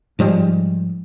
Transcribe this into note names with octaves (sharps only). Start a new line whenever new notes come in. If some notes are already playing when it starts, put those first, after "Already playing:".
G#2 F3 G3 G#3